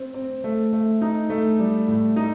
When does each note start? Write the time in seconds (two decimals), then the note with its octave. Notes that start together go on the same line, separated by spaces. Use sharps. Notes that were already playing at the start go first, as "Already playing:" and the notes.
Already playing: C4
0.14 C4
0.44 A3
0.73 A3
1.02 D#4
1.30 A3
1.59 G3
1.88 A2
2.16 D#4